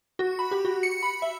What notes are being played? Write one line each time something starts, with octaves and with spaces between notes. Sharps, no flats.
F#4
B5
G4
F#4
C#7
B5
E5